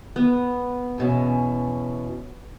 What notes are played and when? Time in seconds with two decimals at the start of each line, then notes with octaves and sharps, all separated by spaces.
0.16 B3
0.98 E2 B2 C#4